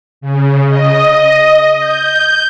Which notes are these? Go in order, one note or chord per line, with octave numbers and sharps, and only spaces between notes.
C#3
D#5
G6